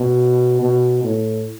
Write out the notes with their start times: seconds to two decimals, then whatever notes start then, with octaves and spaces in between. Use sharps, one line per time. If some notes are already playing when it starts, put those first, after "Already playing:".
Already playing: B2
0.62 B2
1.03 A2